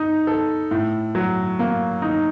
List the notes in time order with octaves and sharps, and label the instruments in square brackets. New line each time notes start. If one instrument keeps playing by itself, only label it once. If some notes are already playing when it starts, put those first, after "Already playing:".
Already playing: [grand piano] D#4
A4
A2
F#3
A#3
D#4